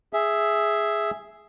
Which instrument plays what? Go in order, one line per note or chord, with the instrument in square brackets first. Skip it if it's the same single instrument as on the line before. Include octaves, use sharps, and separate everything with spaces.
[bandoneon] G#4 E5